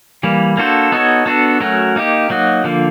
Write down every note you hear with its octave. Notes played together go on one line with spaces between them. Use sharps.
E3 G3 A#3
A#3 D4 F#4 A4 C5
B3 D#4 F#4 A4 C#5
B3 D4 F#4 A4
F#3 A3 C#4 F#4 A#4
A#3 D#4 G4
F#3 A#3 D#4 F#4
D3 F3 A#3